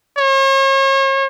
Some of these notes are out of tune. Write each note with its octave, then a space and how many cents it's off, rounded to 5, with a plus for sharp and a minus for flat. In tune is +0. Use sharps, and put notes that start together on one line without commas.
C#5 -40